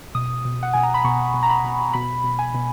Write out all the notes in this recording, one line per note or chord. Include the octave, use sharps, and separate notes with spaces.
B2 D#6
B2
F#5
B2 G#5
A#5
B5
B2 C#6
B2
A#5
B5
B2
B2 B5
B2
G#5
B2